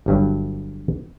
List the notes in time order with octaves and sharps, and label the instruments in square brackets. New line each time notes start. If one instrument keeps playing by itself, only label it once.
[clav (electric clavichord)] G1 G2 F#3